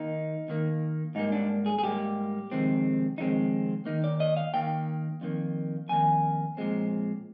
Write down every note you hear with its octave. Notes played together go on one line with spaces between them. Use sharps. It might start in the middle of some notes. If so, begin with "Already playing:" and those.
Already playing: D#2 D#3 A#3 D#4
D#2 D#3 A#3
G#2 G3 A#3 D#4
D4
G#4
G#4
G#2 G3 A#3 G4
F2 C3 D#3 G#3 C4
F2 C3 D#3 G#3 C4 D#4
D#2 D#3 A#3 D#4
D5
D#5
F5
D#2 D#3 A#3 G5
F2 D#3 A#3
F2 D#3 A#3 G#5
A#2 F3 G#3 C4